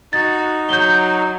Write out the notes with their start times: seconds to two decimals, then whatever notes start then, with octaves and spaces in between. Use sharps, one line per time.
0.13 D#4 F#4 A6
0.69 F#3 G6 G7